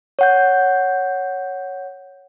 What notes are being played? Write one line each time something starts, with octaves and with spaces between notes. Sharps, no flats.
C#5 F#5 G6